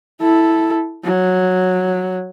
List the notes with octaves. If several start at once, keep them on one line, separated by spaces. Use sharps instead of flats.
E4 A4
F#3